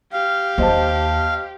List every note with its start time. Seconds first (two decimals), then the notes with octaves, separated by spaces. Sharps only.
0.13 G4 F5
0.58 D#2 C5 D#5 A5